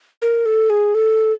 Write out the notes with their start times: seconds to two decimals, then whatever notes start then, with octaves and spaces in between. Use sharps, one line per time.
0.22 A#4
0.46 A4
0.70 G#4
0.95 A4